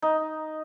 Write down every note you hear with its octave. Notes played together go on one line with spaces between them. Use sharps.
D#4